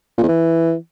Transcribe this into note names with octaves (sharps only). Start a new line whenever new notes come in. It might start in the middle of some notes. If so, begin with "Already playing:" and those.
A#2
E2
E3